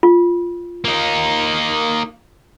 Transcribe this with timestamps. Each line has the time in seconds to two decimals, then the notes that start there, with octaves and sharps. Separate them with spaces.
0.03 F4
0.84 A#3 D#4